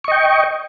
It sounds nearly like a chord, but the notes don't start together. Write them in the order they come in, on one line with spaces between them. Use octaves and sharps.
C#6 D#5 G5